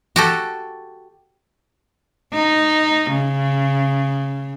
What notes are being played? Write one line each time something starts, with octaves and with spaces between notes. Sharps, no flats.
F#4 G4 A4
D#4
C#3